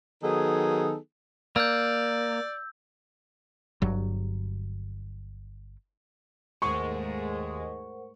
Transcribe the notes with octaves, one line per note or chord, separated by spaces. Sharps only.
D#3 F#3 B3 D#4 G#4 A4
A#3 D5 E6 G6
G1 G2 F#3
D#2 G#2 G#3 A3 A#4 C5 F#5 C#6